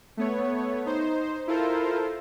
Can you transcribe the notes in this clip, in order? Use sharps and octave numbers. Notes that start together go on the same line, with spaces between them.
A3 B3 C#5
D#4 C5
E4 F4 A4 A#4 C5